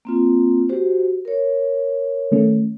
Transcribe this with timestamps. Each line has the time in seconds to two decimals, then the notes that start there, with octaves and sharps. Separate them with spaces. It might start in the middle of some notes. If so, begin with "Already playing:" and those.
0.05 A#3 C4 F4
0.69 F#4 G4 C5
1.25 A#4 C#5
2.32 D#3 A3 C#4